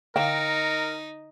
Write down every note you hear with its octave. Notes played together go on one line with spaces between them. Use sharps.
D3 D#4 A#4 F5 G5